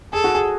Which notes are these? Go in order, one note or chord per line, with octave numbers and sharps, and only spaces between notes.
G#4 A4
F#4
G#4